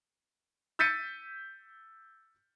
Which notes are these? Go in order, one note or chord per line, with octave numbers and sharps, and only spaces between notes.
E6 G6 A6 B6 C#7 D#7